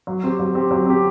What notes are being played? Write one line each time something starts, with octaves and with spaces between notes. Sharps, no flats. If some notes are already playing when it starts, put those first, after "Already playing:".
F#3
C4 G4
F#3
C4 G4
F#3
C4 G4